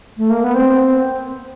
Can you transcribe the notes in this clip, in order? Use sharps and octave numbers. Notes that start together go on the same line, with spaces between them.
A3
A#3
B3
C4